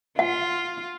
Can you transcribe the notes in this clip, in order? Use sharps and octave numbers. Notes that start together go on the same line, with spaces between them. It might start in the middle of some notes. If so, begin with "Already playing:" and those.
F4 F#5